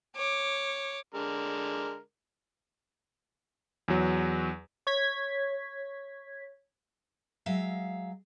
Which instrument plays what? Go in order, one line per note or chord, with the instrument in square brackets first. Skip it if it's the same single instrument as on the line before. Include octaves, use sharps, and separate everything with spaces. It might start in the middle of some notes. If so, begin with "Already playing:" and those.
[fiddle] C#5 D6
[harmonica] D3 G#3 A#4
[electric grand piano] E2 F#3
[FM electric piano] C#5 G#6 B6
[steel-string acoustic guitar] F#3 G#3 E5 F5